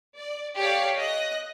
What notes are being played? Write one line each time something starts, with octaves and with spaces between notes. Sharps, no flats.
D5
G4 A4 C#5 D5 F5
D#5 F#6 A#6